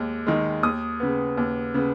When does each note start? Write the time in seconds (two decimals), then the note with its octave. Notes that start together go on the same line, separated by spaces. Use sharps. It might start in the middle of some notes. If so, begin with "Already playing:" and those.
Already playing: D#2 G#3
0.27 D#3 G#3
0.63 D#2 D#6
1.00 C#3 B3
1.37 D#2
1.74 C#3 B3